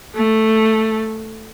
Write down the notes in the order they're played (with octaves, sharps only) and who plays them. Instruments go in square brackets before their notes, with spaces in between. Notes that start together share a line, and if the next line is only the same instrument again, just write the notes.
[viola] A3